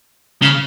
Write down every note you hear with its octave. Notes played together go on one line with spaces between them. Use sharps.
C#3